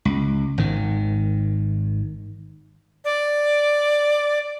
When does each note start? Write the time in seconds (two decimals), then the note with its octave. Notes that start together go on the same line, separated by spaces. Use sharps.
0.05 C#2
0.58 G#1 D#3
3.05 D5